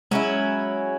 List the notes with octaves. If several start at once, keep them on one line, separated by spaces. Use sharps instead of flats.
F#3 G#3 C#4 E4